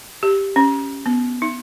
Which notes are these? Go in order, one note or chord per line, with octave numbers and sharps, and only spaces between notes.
G4
C#4
B3
D#4